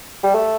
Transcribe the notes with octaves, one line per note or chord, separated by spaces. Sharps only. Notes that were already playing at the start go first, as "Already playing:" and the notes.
G3
A3